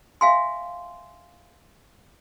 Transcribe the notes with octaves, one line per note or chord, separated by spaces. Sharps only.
E5 F5 G#5 C6